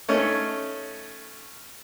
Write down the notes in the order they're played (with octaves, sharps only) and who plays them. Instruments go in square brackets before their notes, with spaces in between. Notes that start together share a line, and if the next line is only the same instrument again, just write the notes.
[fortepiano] A3 C#4 D#4 C#5